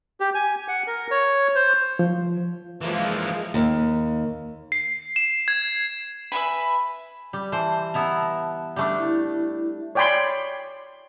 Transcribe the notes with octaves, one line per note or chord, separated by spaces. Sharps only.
G4
G#5
F#5
A#4
C#5
C5
F3
E3 F3 G#3 A#3
D#2
C7
E7
G#6
B4 E5 G#5 B5
G3
E3 C5 A5
B3 E4 A#5
G3 A3 D4
E4
C#5 D5 G5 G#5 B5 C6